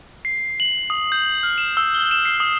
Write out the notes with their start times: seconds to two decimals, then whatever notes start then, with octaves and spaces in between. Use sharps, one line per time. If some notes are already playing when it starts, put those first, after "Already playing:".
0.25 C7
0.60 F#7
0.90 D#6
1.12 G6
1.43 F6
1.58 E7
1.77 E6
1.94 G7
2.11 E7
2.25 C7
2.40 D#6